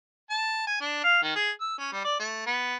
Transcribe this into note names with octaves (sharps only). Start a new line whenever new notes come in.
A5
G#5
D4
F5
D#3
G#4
E6
C#4
G3
D5
A3
B3